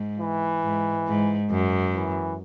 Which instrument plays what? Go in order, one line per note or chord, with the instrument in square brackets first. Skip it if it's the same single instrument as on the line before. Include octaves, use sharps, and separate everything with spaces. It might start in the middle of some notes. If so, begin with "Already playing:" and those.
Already playing: [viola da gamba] G#2
[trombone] E3
[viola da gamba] G#2
G#2
F#2
[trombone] E3